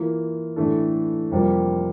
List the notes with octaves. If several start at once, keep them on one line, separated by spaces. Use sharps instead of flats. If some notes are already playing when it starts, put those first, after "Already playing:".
Already playing: E3 A#3 F4
A2 E3 A3 D4 A4
F2 C3 G3 A#3 F4